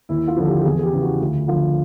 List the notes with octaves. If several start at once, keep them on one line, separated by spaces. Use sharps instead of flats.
D#2 E4
F4
D3 F3
G4
G4
E2 G#4
G#4
G4
C#3 E3
F#4
D2 F4
D3 F3 F4